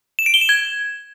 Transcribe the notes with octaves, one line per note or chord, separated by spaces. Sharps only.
E7
D7
G7
E7
G#6